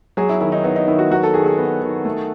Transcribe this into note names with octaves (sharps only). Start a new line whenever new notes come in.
F#3 G#4
E4
D#3 E4
D#4
B3 D#4
D#4
D#3 E4
F#4
F#3 F#4
A4
D#3 G#4
G#4
B3
D#3
A3